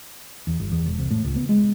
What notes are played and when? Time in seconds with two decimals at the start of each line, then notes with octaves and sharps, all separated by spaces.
0.47 E2
0.60 G1
0.72 E2
0.86 E1
0.99 C2
1.11 A2
1.24 C#2
1.36 B3
1.49 G#3